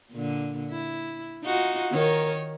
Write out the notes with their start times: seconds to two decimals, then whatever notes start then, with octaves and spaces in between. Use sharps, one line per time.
0.11 A#2 D3
0.71 E4
1.44 D#4 F4 F#4
1.92 D#3 A#4 C#5